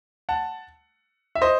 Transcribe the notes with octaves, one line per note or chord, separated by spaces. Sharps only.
F#5 A5
E5
C5 D#5